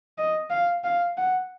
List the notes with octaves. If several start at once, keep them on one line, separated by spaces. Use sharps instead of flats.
D#5
F5
F5
F#5